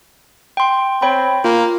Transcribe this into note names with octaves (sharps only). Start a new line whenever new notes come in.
G5 C6
C4 C#5 G5 B5
A#3 F4